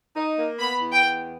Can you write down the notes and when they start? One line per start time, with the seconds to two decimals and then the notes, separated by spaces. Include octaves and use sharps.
0.16 D#4
0.37 A#3
0.59 B3 B5
0.81 E2
0.93 G5
1.04 B3